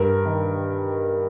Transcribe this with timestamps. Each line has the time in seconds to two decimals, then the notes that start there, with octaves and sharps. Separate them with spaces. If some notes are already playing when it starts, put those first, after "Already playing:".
Already playing: G2 A#4
0.25 D#3